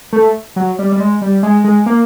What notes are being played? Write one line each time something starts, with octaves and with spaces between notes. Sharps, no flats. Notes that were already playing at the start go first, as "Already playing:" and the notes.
A3
F#3
G3
G3
G#3
G3
G#3
G#3
A#3